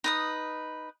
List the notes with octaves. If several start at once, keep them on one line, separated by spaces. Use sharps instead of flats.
D#4 B4 D#6